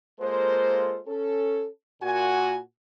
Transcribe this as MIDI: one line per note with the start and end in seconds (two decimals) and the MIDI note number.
0.21 0.99 56
0.21 0.99 58
0.21 0.99 65
0.21 0.99 69
0.21 0.99 72
1.07 1.67 61
1.07 1.67 69
2.02 2.59 46
2.02 2.59 66
2.02 2.59 80